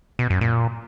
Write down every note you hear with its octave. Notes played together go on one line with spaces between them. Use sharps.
B2
F#2
A#2